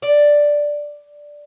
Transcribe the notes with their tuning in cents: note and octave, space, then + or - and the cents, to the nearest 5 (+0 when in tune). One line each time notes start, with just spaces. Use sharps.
D5 +0